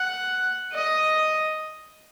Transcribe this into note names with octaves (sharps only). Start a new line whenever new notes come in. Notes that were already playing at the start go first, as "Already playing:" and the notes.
Already playing: F#5
D#5